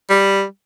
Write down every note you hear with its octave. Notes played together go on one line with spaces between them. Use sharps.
G3